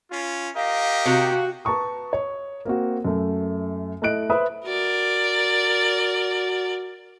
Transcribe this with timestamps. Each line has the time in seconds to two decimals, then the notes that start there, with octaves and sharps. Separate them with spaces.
0.11 C#4 F4
0.56 G4 A#4 D#5 F5
1.05 C3 F#4
1.65 B4 A5 A#5 C#6 D#6
2.13 C#5
2.65 A#3 C4 F#4
3.05 F#2 A3
4.02 A3 E4 D#5 F#6 D7
4.30 B4 C5 E5 D#6
4.66 F#4 A#4 D5